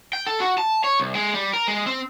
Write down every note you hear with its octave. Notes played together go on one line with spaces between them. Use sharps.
G5
A4
F#4
A5
C#5
C2
G#3
G3
A#4
G#3
C4